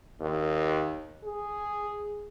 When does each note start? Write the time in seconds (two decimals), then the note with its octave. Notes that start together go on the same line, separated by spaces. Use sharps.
0.20 D#2
1.25 G#4